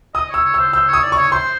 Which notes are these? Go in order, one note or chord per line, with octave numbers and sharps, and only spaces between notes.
D#5 D#6
C#5 E6
C#5
E6
C5
C5 E6
C#5
D#6
D5
C#6
C#5
C5 C6